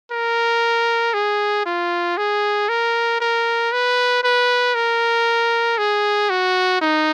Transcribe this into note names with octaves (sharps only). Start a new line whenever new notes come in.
A#4
G#4
F4
G#4
A#4
A#4
B4
B4
A#4
G#4
F#4
D#4